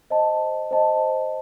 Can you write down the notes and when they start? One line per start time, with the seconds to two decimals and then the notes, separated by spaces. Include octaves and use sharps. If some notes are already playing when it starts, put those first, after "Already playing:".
0.10 C5 D#5 A5
0.71 C5 D#5 A5